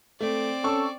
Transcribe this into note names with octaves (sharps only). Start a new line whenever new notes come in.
A3 C4 D5
C#4 A4 C#6